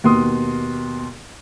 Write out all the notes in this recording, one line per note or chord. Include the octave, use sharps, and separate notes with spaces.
D#2 B2 C6 D#6